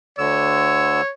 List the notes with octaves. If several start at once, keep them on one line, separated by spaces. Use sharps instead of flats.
D2 D3 C#5 E6